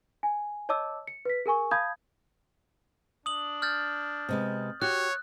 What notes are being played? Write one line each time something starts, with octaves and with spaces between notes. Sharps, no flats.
G#5
C#5 D#5 A5 D6 E6
C#7
B4 B6
G#4 A#4 G#5 C#6
F5 A5 B5 D#6 G6 G#6
D4 D#6 F#7
F6 G6 A6
C3 G#3 B3
F#4 G4 C#5 F#6